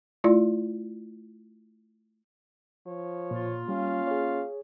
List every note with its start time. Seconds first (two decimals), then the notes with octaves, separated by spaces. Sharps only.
0.24 A3 E4 F4 D5
2.86 F3 C#5
3.31 A#2 A#3 F4
3.68 G3 C#4 F5
4.07 G#4 C#5